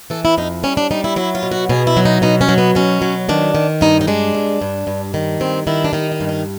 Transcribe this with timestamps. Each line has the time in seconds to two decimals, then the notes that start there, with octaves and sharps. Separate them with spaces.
0.10 E3 A4
0.25 E4
0.38 F2 D#4
0.63 G3 C#4
0.77 D4
0.91 G3 D#4
1.04 E4
1.16 F#3 E4
1.35 F4
1.43 B2
1.52 F#4
1.69 B2 G#4
1.87 E4
1.97 F#3
2.05 D#4
2.22 B2 D#4
2.41 C#4
2.49 F#3
2.58 B3
2.75 B2 C#4
3.02 F#3
3.29 D#3 D4
3.55 D#3
3.81 G2 D#4
4.01 D#4
4.07 G#3 D4
4.35 G2
4.61 G2
4.87 G2
5.14 D#3
5.40 G2 C4
5.67 D#3 E4
5.84 D4
5.93 D#3 D#4
6.12 D#4
6.20 G2
6.29 D#4